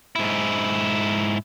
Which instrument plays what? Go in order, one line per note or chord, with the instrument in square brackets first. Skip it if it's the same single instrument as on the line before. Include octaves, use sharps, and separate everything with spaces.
[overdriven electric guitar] G#2 E4